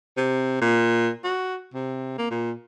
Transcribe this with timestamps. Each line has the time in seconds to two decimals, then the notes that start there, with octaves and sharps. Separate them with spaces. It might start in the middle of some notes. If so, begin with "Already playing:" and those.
0.17 C3
0.61 A#2
1.24 F#4
1.74 C3
2.18 A#3
2.31 A#2